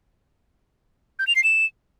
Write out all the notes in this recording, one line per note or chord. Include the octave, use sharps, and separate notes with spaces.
G6
F7
C7
E7